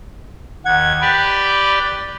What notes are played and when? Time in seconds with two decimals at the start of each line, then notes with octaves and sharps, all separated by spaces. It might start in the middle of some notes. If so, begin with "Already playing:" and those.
0.65 D#2 F#5 G#6
1.01 G4 B4 D5 B5